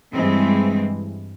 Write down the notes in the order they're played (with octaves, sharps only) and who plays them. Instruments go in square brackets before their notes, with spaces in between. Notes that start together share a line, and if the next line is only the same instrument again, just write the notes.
[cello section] G2 E3 G#3 C4